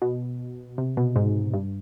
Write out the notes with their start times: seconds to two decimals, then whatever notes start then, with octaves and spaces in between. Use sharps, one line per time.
0.02 B2
0.78 C3
0.97 B2
1.16 G#2
1.54 G2